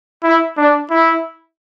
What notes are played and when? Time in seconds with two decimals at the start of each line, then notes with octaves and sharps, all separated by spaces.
0.23 E4
0.57 D4
0.90 E4